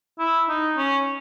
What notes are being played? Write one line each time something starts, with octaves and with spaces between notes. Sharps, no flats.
E4
D#4
C#4